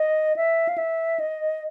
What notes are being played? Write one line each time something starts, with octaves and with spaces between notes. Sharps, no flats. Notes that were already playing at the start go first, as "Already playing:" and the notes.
Already playing: D#5
E5
F5
E5
D#5